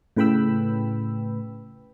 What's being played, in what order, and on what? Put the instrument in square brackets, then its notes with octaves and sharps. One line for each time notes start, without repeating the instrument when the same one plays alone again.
[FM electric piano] A2 C#3 B4 G5 B5 E6